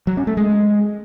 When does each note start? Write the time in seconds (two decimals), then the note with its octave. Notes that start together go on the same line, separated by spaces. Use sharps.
0.07 F#3
0.17 C#4
0.27 A3
0.37 G#3